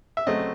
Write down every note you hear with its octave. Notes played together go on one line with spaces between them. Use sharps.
E5
C#3 F#3 A3 C4 D#5